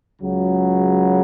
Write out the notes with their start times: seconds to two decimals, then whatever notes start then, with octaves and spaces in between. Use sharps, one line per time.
0.21 C#2 C#3 F#3